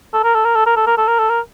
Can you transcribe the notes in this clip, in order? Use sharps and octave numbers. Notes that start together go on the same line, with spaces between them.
A4
A#4
A4
A#4
A4
A#4
A4
A#4
A4
A#4
A4
A#4